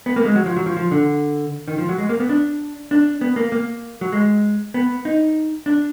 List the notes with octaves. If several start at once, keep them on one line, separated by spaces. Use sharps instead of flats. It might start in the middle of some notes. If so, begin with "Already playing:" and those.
B3
A#3
G#3
F#3
F3
F#3
F3
F3
D3
D#3
F3
F#3
G#3
A#3
B3
D4
D4
B3
A#3
A#3
F#3
G#3
B3
D#4
D4